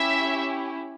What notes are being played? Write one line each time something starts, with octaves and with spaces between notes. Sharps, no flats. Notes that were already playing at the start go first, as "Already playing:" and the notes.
Already playing: C#4 E4 G4 E5